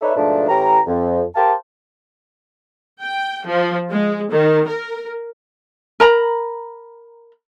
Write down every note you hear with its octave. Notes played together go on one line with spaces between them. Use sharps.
D#4 A4 B4 C#5 D5 E5
G#2 B2 F3 A3 D4
A2 E3 C#4 G4 A#5
F2
G4 A#4 C5 F5 G5 A5
G5
F3
G#3
D#3
A#4
A#4 A#5 B5